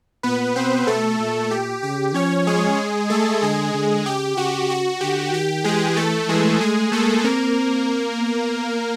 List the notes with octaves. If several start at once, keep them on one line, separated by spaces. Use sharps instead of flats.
A#2 B3 B4
B2 C4 C5
B2 A3 A4
A#2
G4
C#3 G4
F3 C#4 C#5
G#3 G#4
A3 A4
D3 G#3 G#4
D3
C#3 G4
C#3 F#4
F#4
D3 G4
D#3 G4
E3 G#3 G#4
A3 A4
E3 G#3 G#4
G#3 A3 G#4
A3 A#3 A4
A#3 C4 A#4
B3